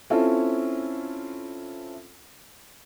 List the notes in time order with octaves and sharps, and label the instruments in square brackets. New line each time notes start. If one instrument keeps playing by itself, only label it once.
[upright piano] C4 C#4 E4 F4 A4